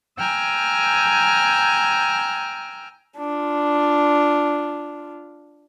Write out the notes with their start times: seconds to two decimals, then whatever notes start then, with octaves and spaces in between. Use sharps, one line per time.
0.17 G5 G#5 A#5 E6 F6 G6
3.17 D4 F4